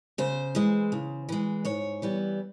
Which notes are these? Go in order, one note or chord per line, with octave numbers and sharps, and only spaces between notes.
C#3 C5
E3 G#3
C#3
E3 G#3
G#2 C#5
E3 G3 B3